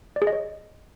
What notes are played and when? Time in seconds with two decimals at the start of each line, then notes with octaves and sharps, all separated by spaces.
0.16 D5
0.22 G#4
0.27 D#5
0.33 C#5